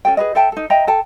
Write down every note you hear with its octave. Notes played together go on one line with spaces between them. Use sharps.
C#4 A4 G5
G#4 B4 D#5
A4 E5 G5 A5
D#4 A4
D#5 E5 G5 A#5
A4 G5 A5